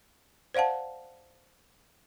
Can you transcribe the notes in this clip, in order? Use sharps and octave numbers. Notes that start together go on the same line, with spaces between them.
C5 D5 F5 F#5 A5